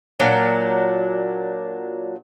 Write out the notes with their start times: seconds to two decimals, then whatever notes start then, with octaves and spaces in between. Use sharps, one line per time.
0.19 A#2 F#3 D4